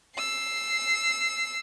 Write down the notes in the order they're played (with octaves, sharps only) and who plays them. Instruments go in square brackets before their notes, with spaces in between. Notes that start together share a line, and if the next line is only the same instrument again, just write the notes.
[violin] E6 C7